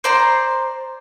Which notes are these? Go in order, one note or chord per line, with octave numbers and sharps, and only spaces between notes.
C5 D5 A#5 C6